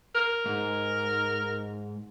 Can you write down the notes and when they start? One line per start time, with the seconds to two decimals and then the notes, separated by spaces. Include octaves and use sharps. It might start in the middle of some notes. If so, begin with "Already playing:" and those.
0.15 A#4
0.46 G#2